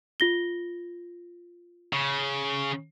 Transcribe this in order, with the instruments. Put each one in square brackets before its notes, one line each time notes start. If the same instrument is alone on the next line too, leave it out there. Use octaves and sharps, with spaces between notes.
[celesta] F4 A#6 G7
[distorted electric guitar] C#3